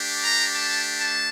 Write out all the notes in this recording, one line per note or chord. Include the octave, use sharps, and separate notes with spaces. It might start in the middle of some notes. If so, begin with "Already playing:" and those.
Already playing: A3 D4 G4
A#5
A5
A5